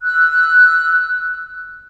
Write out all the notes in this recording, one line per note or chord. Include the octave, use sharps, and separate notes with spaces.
E6 F#6